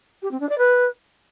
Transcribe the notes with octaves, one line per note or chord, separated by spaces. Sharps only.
G4
C4
D4
D5
B4